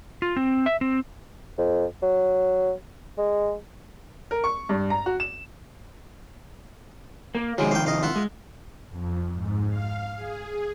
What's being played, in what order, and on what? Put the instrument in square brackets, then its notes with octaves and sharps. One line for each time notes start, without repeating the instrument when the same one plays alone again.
[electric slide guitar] F4
C4
E5
C4
[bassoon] F2
F#3
G#3
[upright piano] A#4
C#6
G2
A#5
F#4
E7
[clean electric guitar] A#3
[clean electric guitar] C3 D#3 F3 [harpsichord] F#3 G#3
[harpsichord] F5 G5
D#5 F5
F4 E5 F#5
[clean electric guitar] G#3
[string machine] F2
G#2
F5
G#4